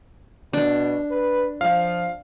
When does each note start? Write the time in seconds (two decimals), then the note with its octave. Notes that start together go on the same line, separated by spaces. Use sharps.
0.53 B2 D4
1.11 B4
1.61 F3 F5